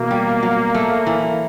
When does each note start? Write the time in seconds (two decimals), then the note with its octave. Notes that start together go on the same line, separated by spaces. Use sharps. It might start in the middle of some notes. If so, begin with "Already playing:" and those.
Already playing: B2 E3 A#3
0.11 G3
0.43 F#3
0.75 A3
1.07 E3